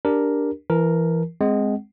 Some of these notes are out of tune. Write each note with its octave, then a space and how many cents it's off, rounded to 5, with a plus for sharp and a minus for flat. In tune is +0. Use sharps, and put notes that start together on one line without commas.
D4 +0 G4 +0 A#4 +0
E3 +20 A#4 +0 A5 -35
G#3 +0 C4 +0 F#5 +25